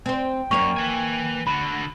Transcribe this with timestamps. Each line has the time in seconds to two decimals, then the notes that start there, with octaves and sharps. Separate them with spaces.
0.06 C4 C5 G5
0.51 F#2 A#3 C#5 C#6 F7
0.76 B4 G#5
1.47 D3 F#4 B5